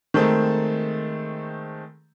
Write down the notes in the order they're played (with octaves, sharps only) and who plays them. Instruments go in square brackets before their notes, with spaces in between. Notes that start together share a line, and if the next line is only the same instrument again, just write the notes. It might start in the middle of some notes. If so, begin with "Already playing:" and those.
[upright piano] D#3 G#3 A3 C4